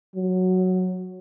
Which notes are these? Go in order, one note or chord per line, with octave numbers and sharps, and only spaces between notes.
F#3